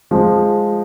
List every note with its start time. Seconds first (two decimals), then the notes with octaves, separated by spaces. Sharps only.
0.11 F3 G#3